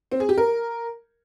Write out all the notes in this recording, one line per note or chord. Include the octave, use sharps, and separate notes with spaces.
C4
G#4
G4
A#4